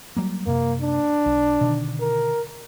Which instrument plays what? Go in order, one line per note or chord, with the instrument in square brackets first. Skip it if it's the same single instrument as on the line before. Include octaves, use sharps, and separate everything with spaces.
[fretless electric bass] F#3 G3 A#3
[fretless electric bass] F#2 C3 [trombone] A#3
[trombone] D4
[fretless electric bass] B1
B2 D3 D#3
[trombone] A#4